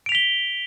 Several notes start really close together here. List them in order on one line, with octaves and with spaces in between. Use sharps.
D7 F7 B6 G7